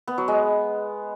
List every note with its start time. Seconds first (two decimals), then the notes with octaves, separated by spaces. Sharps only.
0.07 B3
0.18 F#3
0.28 G#3